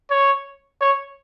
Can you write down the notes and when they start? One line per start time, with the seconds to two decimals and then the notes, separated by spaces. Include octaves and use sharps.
0.10 C#5
0.81 C#5